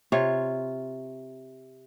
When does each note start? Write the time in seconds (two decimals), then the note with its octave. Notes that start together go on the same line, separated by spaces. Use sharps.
0.12 C3 F4 C#5